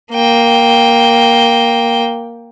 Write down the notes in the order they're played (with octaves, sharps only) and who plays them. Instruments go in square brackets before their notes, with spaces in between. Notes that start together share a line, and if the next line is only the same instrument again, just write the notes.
[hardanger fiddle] A#3 G5